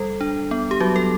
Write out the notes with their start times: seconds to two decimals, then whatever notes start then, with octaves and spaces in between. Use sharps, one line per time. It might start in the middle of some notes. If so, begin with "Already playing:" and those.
Already playing: G3 A4
0.21 D4
0.51 B3
0.71 G4
0.80 F#3 F#4
0.96 A4